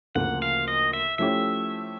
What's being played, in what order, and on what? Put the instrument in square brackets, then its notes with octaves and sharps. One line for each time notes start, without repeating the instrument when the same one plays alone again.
[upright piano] D2 C#3 F3 A#3 [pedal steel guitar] F#5
[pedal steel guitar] F5
D#5
E5
[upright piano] F3 A3 C#4 E4 G4 [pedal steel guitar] E5